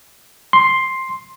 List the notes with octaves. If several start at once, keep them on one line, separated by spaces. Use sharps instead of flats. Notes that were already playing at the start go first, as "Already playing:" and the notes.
C6